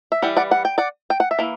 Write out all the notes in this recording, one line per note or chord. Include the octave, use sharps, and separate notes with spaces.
E5
E3 G3 F#5
D5 F#5
F#5
G5
D5 F#5
G5
F#5
E5
E3 A#3